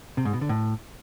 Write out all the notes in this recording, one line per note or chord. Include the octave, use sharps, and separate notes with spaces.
C3
G#2
B2
D3
A2